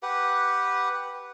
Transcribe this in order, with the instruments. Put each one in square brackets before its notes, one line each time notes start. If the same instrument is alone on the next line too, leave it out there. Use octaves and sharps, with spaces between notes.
[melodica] G4 B4 F#5